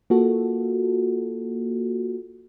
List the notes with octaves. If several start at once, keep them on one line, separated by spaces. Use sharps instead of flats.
A#3 F4 F#4 A4